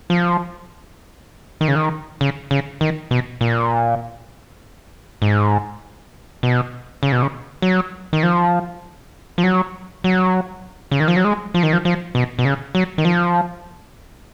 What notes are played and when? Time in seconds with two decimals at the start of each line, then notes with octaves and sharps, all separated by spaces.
0.10 F3
1.61 D#3
1.68 C#3
1.76 D#3
2.21 C#3
2.51 C#3
2.81 D#3
3.11 B2
3.41 A#2
5.22 G#2
6.43 B2
7.03 C#3
7.12 B2
7.22 C#3
7.62 F#3
8.13 D#3
8.23 F3
9.38 F3
9.44 F#3
10.04 F#3
10.92 C#3
11.00 D#3
11.08 F3
11.16 F#3
11.24 G#3
11.54 F3
11.63 D#3
11.73 F3
11.85 F3
12.15 B2
12.39 B2
12.45 C#3
12.75 F#3
12.98 D#3
13.05 F3